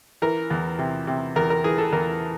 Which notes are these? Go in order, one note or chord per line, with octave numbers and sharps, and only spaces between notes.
E3 A#4
E2
C3
C3
E2 A#4
A#4
E3 G#4
A4
E2 A#4